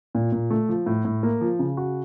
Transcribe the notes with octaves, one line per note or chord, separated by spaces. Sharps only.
A#2
A#2
A3
F3
A2
A2
A#3
F3
C#3
F#4